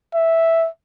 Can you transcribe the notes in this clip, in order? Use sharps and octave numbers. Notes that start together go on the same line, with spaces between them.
E5